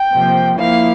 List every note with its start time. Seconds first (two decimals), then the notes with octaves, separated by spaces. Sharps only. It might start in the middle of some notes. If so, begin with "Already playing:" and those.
Already playing: G5
0.12 C3 F3 A#3
0.58 F3 A#3 E4 F5